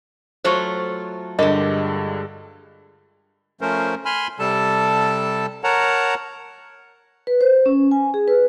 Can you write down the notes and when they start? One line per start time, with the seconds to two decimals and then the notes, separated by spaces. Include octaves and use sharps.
0.45 F#3 A3 F4 C5 C#6
1.39 G2 D3 G#3 G4 A#4 D#5
3.61 F3 A3 C#4 A#4 C5
4.05 G#5 B5 C6 F6
4.39 C3 G3 A4 A5
5.64 A#4 C#5 F#5 A5 A#5
7.27 B4
7.41 C5
7.66 C#4
7.91 G#5
8.14 G#4
8.28 B4